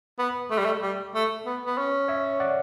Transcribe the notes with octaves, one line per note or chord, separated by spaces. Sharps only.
B3
A3
G3
A3
G3
A3
B3
B3
C#4
C#5 E5
D5 F#5